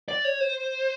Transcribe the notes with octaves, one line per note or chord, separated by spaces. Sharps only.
D5
C#5
C5